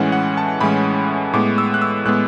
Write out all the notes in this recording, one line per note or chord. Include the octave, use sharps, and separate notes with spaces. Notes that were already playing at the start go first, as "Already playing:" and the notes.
Already playing: A2 E3 G#3 C#4 F#5
F#5
A5
A2 E3 G#3 C#4 B5
A2 G#3 B3 D6
E6
F#6
E6
A2 G#3 B3 F#6